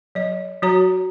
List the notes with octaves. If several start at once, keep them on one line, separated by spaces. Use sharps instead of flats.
F#3 D#5
F#3 F#4 C#5 A#5